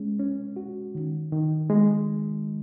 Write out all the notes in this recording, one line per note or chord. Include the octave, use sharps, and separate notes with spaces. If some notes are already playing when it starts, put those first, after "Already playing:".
Already playing: G#3 C#4
C#4
F#4
D#3
D#3
G#3